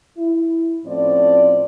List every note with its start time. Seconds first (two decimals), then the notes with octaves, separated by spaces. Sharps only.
0.17 E4
0.86 A2 F3 C4 C#4 D5